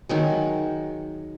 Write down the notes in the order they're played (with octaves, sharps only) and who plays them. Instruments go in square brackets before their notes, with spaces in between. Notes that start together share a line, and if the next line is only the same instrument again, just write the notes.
[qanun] D#3 F#3 G#3